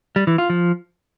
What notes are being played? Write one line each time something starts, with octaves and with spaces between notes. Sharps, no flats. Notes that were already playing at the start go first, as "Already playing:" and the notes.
G3
E3
F4
F3